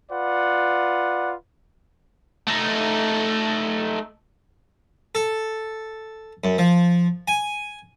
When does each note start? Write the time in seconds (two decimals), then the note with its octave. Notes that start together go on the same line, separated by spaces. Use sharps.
0.10 F4 B4 D5 F#5
2.48 A3 D#4
5.15 A4
6.44 F#2
6.58 F3
7.28 G#5